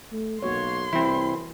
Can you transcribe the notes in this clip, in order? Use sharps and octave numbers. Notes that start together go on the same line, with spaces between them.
A3
B1 A#3 F#4 C#5 C6
C2 E3 C4 E4